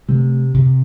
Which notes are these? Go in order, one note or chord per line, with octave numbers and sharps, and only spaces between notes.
C3 A3
C3